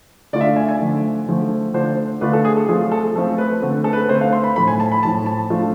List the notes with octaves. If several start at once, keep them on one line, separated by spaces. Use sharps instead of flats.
D3 A3 D4 F4 D5
E5
F5
G#5
G#5
D3 F3 A3
D3 F3 A3
D3 A3 D4 F4 C5
D3 A3 D4 F4 B4
A4
G#4
A4
F3 A3 C4 F4 G#4
A4
F3 A3 C4 F4 A4
B4
D3 A3 C4
A4
B4
D3 A3 C4 C5
F5
C6
B5
A2 F3 A3 B5
G#5
A5
B5
A2 F3 A3 A5
A5
F3 A3 D4 F4